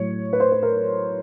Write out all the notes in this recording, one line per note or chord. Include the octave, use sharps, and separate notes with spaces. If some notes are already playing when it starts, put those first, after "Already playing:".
Already playing: A2 F#3 C#5
B4
C5
B4
A#4